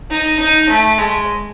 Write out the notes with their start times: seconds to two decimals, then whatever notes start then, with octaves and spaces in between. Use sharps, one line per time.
0.11 D#4
0.40 D#4
0.69 A3
0.98 G#3